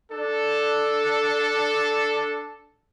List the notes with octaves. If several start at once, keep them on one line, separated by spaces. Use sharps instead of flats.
D4 A4